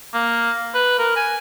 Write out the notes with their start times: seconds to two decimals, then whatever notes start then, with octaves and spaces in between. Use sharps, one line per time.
0.14 A#3
0.75 B4
0.99 A#4
1.16 G#5